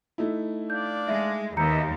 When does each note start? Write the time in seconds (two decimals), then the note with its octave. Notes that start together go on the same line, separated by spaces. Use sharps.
0.18 A3 D#4 E4
0.70 D4 D5 F5 G6
1.08 G#3 E5
1.57 D#2 B4 D#5 E5 A#5 G6 C#7